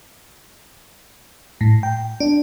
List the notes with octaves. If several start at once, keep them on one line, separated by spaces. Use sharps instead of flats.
A2
G5
D4